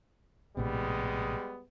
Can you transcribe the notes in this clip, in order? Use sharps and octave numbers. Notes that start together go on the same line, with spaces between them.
A#1 A2 C3 G3 G#3 B3